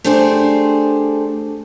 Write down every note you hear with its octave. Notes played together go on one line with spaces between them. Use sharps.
A3 D4 G4 G#4 C5 D5